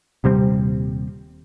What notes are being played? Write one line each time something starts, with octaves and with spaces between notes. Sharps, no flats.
D#1 C3 G3 C4